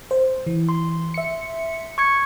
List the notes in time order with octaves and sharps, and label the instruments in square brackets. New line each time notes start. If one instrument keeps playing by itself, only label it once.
[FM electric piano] C5
E3
[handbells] C6
[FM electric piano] E5 C#7
[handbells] C#6 G#6 C#7